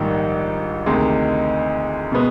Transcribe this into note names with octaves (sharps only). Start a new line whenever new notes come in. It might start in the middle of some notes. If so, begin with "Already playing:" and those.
Already playing: A#1 G#2 D#3 G3
D2 C3 D#3 G#3
B2 G#3 B3